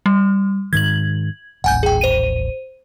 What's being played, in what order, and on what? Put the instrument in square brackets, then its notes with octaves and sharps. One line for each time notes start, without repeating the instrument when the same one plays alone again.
[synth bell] G3
[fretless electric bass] G#2 D#3 [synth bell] G#6 F#7
[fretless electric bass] D#1 A1 [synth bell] F#5 G#5 G6
[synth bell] G#4 G5
C5 D#7